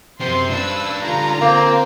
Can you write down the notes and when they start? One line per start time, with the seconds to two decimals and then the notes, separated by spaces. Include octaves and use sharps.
0.20 F#2 C3 C5 C6
0.51 D4 B4 E6
1.02 D3 F4 A#5
1.41 A#3 C4